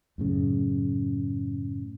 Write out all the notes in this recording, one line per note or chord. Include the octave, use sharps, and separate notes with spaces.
F#2 A2 C#3